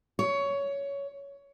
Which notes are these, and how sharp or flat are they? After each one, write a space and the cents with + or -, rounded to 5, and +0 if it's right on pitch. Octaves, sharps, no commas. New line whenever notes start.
C#5 +15